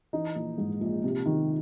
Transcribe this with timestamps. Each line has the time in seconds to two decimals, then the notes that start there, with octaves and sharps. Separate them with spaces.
0.13 E3 D#4
0.36 A#1
0.58 G#2
0.81 A#1
1.04 C3
1.26 D#3